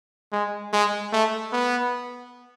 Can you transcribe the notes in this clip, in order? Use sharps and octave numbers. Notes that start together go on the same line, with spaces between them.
G#3
G#3
A3
B3